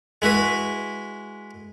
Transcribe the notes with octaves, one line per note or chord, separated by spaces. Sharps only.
G#3 E4 F#4 B4